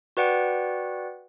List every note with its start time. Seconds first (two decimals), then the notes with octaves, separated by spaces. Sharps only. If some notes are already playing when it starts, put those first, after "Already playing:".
0.17 F#4 B4 D5 F#5 G5